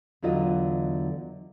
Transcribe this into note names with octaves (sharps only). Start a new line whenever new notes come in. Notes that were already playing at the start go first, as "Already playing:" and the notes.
E2 D3 F#3 F4 D#5